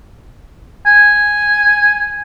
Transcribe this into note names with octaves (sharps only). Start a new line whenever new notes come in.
G#5